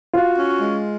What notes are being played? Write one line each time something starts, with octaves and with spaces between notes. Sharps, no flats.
F4 F#4
C#4
G#3